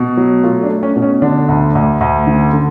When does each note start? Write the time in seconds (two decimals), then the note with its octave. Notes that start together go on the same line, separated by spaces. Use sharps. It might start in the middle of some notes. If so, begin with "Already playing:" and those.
Already playing: B2
0.17 F#3
0.43 A3 F4
0.63 D4
0.70 A3
0.83 C#4
0.96 B2
1.02 C#4
1.22 D3 D4
1.49 D2
1.75 D2
2.01 D2
2.27 D3
2.53 D3